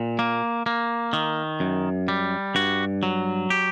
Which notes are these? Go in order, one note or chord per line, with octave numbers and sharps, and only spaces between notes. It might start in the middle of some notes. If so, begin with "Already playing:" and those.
Already playing: A#2
A#3
A#3
D#3
F#2
G3
G2 F#4
F#3
G4